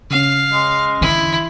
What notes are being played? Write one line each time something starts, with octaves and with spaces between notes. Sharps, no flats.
C#3 C#4 F5
G#3
D3 E3 E4